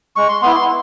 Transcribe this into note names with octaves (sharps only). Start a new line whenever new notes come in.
G#3 C#6
C6
B3 E4 C6
C6